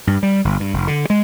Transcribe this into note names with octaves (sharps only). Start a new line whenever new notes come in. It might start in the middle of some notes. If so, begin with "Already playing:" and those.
G2
G3
G1
G2
F1
D3
G#3